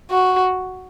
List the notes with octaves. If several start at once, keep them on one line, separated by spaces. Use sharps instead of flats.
F#4